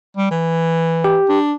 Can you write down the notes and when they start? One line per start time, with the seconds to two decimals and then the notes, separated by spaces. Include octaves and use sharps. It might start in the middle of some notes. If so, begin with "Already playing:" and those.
0.16 G3
0.31 E3
1.04 G4
1.29 D4